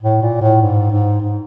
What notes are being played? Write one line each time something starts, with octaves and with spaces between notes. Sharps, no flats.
A2
A#2
A2
G#2
G#2
G#2